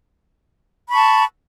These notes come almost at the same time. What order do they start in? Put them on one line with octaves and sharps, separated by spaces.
B5 C#6 A5